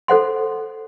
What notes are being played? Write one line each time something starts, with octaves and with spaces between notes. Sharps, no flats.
A4 C5 F#5 C6